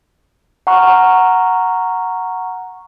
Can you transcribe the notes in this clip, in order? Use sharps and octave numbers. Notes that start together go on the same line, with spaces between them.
F#5 A#5 C#6 F6